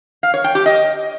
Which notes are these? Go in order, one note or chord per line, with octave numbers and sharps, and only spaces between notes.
F5
C#5
G5
G4
D#5